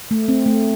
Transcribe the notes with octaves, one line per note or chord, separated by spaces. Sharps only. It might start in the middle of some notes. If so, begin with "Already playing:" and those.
A3
C4
A3